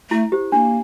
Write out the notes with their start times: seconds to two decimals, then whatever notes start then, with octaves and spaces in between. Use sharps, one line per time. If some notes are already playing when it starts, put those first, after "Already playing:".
0.11 A3 E4
0.32 G4 C5
0.52 A#3 D4